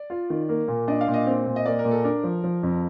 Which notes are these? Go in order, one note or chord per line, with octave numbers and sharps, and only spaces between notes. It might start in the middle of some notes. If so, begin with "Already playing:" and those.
Already playing: D5
F4
D#3
A#3
A#2
D4 D#5
F5
A#2
D#5
C4
A#2
D#5
A#3 D5
A#4
A#2
A4
D4 A#4
F3
F3
F2